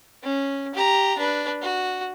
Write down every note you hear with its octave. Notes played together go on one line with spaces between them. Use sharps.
C#4
G4 A#5
D4 B4
F#4